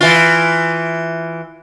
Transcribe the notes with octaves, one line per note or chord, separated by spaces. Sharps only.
E3 F4